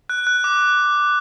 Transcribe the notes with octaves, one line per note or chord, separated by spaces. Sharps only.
F#6
F#6
D6